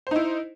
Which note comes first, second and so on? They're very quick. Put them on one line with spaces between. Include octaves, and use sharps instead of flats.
C5 D#4 E4